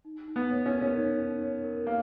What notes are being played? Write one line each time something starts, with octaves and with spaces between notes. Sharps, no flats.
D#4
D#4
B3
C#5
C#4
A#4
C#4
D#4
D#4
C#5
A#4
A#3